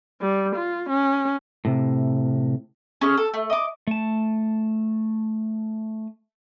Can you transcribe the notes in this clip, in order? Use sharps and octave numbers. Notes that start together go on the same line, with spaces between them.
G3
F4
C#4
A2 C3
C#4 G#4 F6
A4
A3
D#5 D6
A3 A5